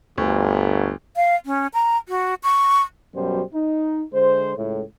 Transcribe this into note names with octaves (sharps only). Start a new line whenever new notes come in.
G1 D2
F5
C#4
A#5
F#4
C#6
F#2 B2 F#3 G3 C5
D#4
D3 G#3 C5
C#2 A2